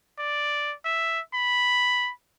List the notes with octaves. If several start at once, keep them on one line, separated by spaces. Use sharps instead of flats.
D5
E5
B5